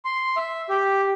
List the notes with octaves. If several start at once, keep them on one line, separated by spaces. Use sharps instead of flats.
C6
E5
G4